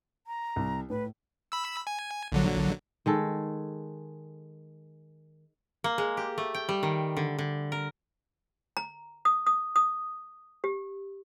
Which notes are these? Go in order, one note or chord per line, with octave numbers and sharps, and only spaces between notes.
A#5
C2
A2 B4
B5 E6
G#5
A#1 D3 F#3
D#3 G#3 A4
A#3
G#3
G4
A3
G5
G3
D#3
D3
D3
A#4
A#5
D#6
D#6
D#6
G4